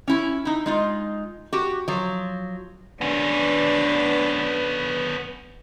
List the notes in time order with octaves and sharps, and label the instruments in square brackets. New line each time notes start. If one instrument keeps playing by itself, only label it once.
[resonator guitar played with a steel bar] C#4 E4
D#4 E4
G#3 D#4 F4
F#4 G4
F3 F#3
[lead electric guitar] B3 C#4 [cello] D4 B4